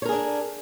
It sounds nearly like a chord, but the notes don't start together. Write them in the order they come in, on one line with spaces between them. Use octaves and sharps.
C#5 A#4 G#4 D4